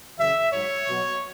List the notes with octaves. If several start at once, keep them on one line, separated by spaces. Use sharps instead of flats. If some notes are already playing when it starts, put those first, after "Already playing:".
F#2 C#3 E3 E5
G#2 F#3 C#5
B2 F#3